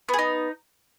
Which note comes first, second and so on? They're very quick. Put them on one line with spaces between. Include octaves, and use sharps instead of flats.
B3 G#4 D#4